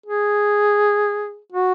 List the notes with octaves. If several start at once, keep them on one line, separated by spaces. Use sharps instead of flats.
G#4
F#4